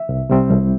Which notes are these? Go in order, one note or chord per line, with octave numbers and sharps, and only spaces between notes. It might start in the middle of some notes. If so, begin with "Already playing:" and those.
Already playing: E5
C2
C3 G3 C4
C2